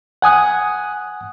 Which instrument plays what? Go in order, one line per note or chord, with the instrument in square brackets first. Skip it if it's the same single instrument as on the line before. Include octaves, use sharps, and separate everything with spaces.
[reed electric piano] F#5 G#5 D#6 F#6